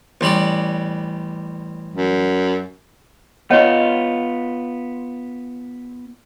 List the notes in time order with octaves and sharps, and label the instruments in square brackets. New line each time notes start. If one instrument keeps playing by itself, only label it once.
[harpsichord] A1 G3 D5
[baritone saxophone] F#2
[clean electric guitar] B3 F4 [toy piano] C#5 D#5 F#5